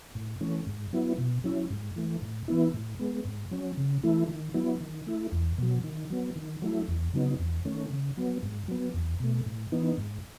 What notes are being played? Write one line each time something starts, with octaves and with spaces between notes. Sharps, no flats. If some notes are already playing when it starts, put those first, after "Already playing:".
A2
E3 A3 C#4
G#2
F#3 B3 E4
B2
F#3 C#4 E4
G#2
E3 A3
A2
E3 B3 E4
A2
G#3 B3
G#2
F#3 C#4
C#3
E3 A3 E4
D#3
F#3 B3 E4
D#3
A3 E4
E2
B2 F#3
D#3
F#3 B3
D#3
F#3 A3 E4
E2
C#3 F#3 B3 D#4
E2
D#3 A3 C#4
C#3
F#3 B3
G#2
F#3 B3
E2
B2 A3
A2
E3 B3 D#4
G#2